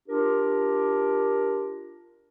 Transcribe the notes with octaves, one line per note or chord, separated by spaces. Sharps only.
D4 F4 G4 A#4